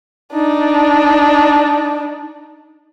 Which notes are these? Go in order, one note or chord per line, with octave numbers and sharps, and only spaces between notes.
D4 D#4